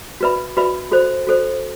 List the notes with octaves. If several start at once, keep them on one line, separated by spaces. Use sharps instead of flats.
F#4 B4 E5 B5
F#4 B4 E5 B5
F#4 A4 C5
F#4 A4 C5